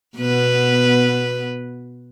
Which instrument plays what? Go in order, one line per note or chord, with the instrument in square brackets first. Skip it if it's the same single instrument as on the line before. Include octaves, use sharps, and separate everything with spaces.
[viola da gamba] B2 B3 B4